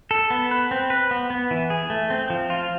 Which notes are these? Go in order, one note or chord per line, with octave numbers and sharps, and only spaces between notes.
A4
B3
B4
C4
B4
B3
B3
E3
G#4
A3
C4
F3
F4